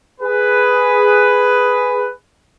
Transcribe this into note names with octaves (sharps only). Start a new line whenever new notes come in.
G#4 B4